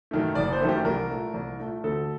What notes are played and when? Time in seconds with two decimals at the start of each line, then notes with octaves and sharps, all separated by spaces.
0.11 F#2 D#3 A3
0.35 F#1 D5
0.52 C5
0.60 F#2 D#3 A3
0.69 G4
0.85 C2 A#4
1.10 A#2 A3
1.34 C2
1.60 A#2 A3
1.84 D2 A4